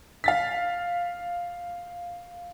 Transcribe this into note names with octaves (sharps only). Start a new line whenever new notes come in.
F5 A6 B6